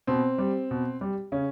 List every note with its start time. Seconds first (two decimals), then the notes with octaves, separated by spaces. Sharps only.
0.07 B2 C4
0.38 G3
0.71 B2
1.01 G3
1.32 C#3 C#4